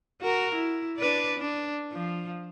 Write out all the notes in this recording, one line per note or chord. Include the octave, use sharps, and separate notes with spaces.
F#4 A#4
E4
D4 B4 D5
D4
F3